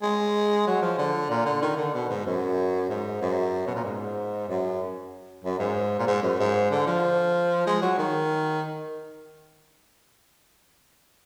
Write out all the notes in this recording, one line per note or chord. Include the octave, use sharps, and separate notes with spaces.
G#3
F#3
F3
D3
A#2
D3
D#3
D3
B2
G#2
F#2
G#2
F#2
B2
A#2
G#2
F#2
F#2
G#2
A#2
G#2
F#2
G#2
D3
F3
G#3
F#3
D#3